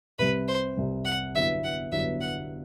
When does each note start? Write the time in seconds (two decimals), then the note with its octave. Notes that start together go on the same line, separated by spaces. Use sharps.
0.19 C2 C3 G3 C4 B4
0.48 C5
0.77 C2 C3 G3 C4
1.05 F#5
1.34 G1 G2 F#3 B3 E4 E5
1.64 F#5
1.92 G1 G2 F#3 B3 E4 E5
2.21 F#5